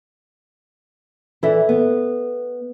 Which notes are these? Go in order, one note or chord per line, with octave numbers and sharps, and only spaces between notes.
E3 A4 D5 E5
B3